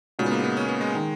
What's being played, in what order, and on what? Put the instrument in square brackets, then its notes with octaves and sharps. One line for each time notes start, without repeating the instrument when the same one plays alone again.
[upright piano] A#2 G#3 D#4 F#4 [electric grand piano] C#3
[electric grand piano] B3
A#3
B3
C#4
B3
G#3
[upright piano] D#3